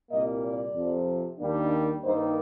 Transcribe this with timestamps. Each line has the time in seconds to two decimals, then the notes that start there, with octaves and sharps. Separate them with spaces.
0.11 C2 A#2 G3 A#3 D#5
0.43 D5
0.74 F2 C3 F3
1.39 D#2 D#3 G3 A#3 D4
2.04 G2 D#3 G3 A#3 D#4 C5